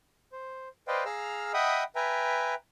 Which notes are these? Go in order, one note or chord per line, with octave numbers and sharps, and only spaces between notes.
C5
B4 C5 D5 D#5 F5 G5
G#4 F5 A#5 E6 F6
D#5 E5 F#5 G5 B5 D#6
B4 E5 G5 G#5 A#5